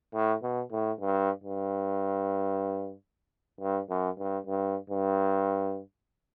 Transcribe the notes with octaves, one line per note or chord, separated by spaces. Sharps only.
A2
B2
A2
G2
G2
G2
F#2
G2
G2
G2